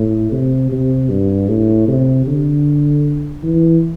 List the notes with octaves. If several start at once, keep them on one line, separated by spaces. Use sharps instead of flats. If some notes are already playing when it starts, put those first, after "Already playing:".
Already playing: A2
C3
C3
G2
A2
C3
D3
E3